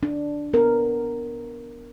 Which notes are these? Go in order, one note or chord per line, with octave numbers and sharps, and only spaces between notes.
D4
B3 A#4